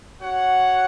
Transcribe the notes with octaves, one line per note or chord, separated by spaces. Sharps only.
F#4 C#5 F#5